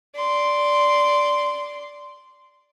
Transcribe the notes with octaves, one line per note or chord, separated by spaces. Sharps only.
D5 C6